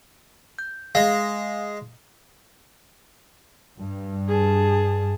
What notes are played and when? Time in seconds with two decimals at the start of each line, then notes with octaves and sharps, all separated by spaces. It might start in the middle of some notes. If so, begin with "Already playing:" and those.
0.59 G6
0.95 G#3 F5
3.79 G2
4.28 G#4 A5